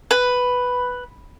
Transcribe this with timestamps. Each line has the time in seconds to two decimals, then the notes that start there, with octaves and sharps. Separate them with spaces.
0.11 B4